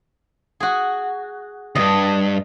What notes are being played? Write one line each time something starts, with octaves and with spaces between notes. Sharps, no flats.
F#4 G#4
D2 G2 D#5